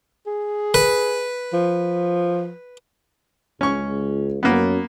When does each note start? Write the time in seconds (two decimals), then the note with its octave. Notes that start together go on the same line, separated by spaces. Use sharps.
0.27 G#4
0.74 B4
1.53 F3
3.61 C#2 C#4 C#6
4.43 F#2 A#3 B3